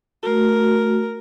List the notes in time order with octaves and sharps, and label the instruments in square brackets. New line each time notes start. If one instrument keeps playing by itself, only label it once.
[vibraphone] A3 F#4 [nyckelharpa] A#4